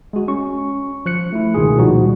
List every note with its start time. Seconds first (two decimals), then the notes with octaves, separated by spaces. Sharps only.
0.13 G#3 F#4
0.28 C#4 C#6
1.06 F3 F#6 C#7
1.32 A3 E4
1.54 C#2 B2 D#3 F4 G#4
1.78 A#2 F3 G3 D#4 F#4